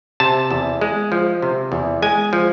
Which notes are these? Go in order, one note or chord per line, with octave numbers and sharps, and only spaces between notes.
C3 A5
E2
G#3
F3
C3
E2
G#3 G#5
F3